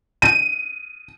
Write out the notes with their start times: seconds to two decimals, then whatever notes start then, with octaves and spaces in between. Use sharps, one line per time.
0.22 D#7